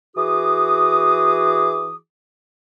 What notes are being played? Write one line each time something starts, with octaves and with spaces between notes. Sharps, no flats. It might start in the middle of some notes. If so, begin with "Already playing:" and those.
E3 F#4 G#4 D6 D#6